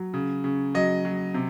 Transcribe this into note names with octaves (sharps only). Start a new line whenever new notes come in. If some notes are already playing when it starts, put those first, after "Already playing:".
Already playing: F#3
C#3
C#3
F#3 D#5
F#3
C3